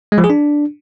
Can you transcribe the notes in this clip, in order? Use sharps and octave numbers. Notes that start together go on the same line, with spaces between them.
G#3
F3
G#4
D4